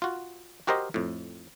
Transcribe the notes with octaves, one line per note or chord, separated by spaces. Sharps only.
F4 F#4
F#4 G4 A#4 C5 D#5
F2 A2